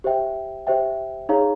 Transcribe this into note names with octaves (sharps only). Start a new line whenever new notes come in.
G4 C5 E5 G5
G4 C5 E5 G5
D#4 G#4 C#5 F5 A#5